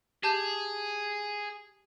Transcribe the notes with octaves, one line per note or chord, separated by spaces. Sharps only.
G4 G#4 A5 G6